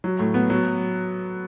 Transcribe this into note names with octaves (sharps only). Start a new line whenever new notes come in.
F#3
A2
B3
F#3